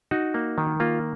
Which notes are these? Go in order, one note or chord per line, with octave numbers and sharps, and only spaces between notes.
D#4 F#4
A#3
D#3
A#3 F4